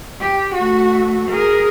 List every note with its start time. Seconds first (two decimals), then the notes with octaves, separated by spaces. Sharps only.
0.21 G4
0.55 A3 F#4
1.29 G#4 A#4